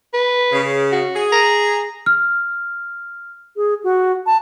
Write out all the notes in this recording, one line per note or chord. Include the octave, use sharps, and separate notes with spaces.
B4
C#3
F#4
G#4
A#5
F6
G#4
F#4
A5